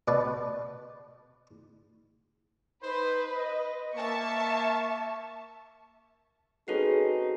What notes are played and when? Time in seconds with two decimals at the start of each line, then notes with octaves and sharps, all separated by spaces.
0.08 B2 B4 D5 A5
2.83 D#4 B4 C5
3.36 D#5
3.96 A#3 E5 A5 C#6
6.68 C4 C#4 D#4 F#4 G#4 A4 B4 C7